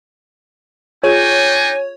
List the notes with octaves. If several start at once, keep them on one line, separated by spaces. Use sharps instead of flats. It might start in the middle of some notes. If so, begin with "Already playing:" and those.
D4 D#4 F4 G#4 C#5 G5 G#5